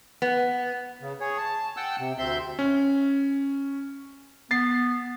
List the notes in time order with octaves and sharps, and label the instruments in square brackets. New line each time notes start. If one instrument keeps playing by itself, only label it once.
[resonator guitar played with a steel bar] B3
[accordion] C#3
G#4 C#5
A5
F#5 G5 A5 E6
C3
D2 C4 E5 C6 G6
[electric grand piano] C#4
[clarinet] B3 [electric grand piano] A6 C7